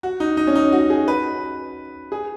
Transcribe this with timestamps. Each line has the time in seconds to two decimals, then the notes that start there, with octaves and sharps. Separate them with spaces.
0.03 F#4
0.20 D#4
0.37 D#4
0.47 C#4
0.55 D#4
0.72 F#4
0.90 G#4
1.08 B4
2.12 G#4